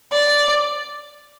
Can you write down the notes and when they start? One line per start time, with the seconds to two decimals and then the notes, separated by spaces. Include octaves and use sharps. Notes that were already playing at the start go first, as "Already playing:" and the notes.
0.12 D5